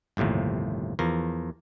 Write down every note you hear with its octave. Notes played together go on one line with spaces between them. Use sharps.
G1 D#2 A2 C3 F3
E2 F3 A#4